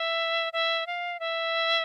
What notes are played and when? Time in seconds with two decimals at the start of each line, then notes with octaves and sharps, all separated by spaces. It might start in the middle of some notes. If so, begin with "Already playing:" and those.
Already playing: E5
0.53 E5
0.87 F5
1.20 E5